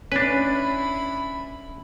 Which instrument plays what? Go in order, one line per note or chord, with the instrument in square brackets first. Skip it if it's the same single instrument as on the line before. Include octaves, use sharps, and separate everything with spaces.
[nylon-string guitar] C#4 [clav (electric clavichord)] D4 B4 [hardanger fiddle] E4 B5